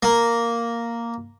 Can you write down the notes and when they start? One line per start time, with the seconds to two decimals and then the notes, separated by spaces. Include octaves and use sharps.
0.03 A#3